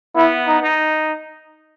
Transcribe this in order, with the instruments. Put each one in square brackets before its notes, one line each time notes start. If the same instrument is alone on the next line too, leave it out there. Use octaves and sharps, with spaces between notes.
[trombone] B3 [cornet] E4
[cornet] D#4
[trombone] D#4